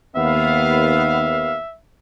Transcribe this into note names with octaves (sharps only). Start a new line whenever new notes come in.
D#2 B3 E5 F5